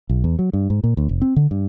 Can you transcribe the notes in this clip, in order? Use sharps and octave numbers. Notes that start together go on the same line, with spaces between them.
B1
E2
F#3
G2
G#2
A#2
D2
F1
C4
D3
G2